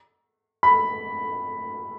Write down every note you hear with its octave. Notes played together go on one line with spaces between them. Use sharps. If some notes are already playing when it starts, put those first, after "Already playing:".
B5